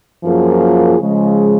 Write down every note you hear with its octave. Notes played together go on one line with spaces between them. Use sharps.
F#2 F3 A#3 F4 G#4
C#3 F3 G#3